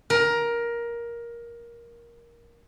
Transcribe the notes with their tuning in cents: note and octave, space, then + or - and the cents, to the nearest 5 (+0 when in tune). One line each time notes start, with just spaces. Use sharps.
A#4 +15